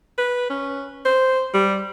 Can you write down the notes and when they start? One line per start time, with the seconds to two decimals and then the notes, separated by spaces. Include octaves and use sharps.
0.18 B4
0.50 C#4
1.05 C5
1.54 G3